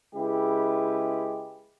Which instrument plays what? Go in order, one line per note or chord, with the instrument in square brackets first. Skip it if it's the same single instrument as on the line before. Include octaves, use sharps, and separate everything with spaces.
[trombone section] C#3 G#3 E4 G4 B4